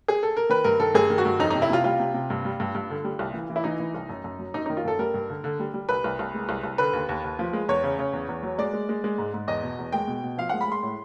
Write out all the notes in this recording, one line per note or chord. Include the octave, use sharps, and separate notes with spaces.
G#4
A4
A#4
D#3 B4
G2 A#4
D#3 A4
G2 G#4
D#3
F#4
G2
F2 D#4
C3 D#4
E4
C3 F4
G3 F4
C3
C3
G2
G3
G2
G2
D3
G3
C2
E3
E3
E4
E3 D#4
E3
C2
F#2
F#2
F#3
F#2 D#4
D#3 D#4
F4
F#2 A4
G3 A#4
G2
D3
D3
G3
G3
C2 B4
C2
C2
G#3
C2
C2
D3 B4
D#2
D#2
D#2
F3
G#3
E2 C#5
C#3
C#3
E2
E2
F#3
G#3 D5
G#3
G#3
G#3
G#2
G#2
E2 D#5
B2
E2
G#3 G5
B2
B2
F3 F5
G#3 F#5
B5
G#3 C6
A2